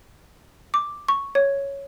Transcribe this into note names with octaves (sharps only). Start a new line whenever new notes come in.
D6
C#6
C#5